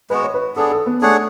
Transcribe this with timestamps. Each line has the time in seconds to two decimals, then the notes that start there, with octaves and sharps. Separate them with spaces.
0.10 G#3 B3 F#4 B4
0.22 C#5
0.34 B4
0.56 B3 D4 G#4 A4
0.72 A4
0.86 B3
1.01 A3 D4 G#4 C#5 F#5